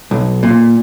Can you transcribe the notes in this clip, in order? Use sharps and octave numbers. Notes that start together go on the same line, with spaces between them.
B1
A#2